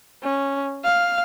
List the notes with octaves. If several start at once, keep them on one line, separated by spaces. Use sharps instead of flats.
C#4
F5